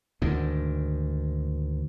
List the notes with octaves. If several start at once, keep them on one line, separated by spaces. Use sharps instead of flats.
D2 G#2 D#3